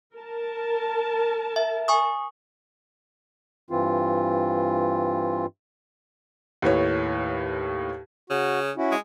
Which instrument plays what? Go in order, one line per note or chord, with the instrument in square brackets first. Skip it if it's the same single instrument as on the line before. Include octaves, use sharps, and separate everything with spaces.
[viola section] A#4 A5
[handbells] E5
G#5 C#6 D#6
[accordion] G2 E3 C4 F4
[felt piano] D#2 A2 B4 C#5
[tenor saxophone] C#3 [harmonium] F#4
[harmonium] C#4 E4 F#4
[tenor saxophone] G#3